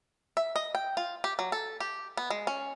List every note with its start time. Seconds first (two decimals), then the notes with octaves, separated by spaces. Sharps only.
0.37 E5
0.56 D#5
0.75 G5
0.97 F4
1.24 G4
1.39 F#3
1.52 A4
1.80 G4
2.17 B3
2.30 G#3
2.47 C#4